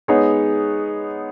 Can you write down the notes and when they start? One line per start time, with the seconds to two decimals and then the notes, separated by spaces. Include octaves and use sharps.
0.08 G#3 B3 D#4 G#4 C#5